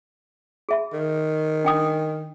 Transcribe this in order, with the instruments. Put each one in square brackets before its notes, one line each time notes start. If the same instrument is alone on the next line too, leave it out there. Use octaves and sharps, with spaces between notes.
[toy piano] G#4 E5 B5
[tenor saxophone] D#3
[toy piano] D4 G5 D#6